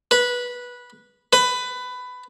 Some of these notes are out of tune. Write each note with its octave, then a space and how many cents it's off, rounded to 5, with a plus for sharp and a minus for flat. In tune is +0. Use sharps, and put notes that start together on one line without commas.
B4 -15
B4 +15